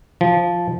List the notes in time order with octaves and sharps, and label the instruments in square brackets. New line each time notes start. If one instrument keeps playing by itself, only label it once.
[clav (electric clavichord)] F3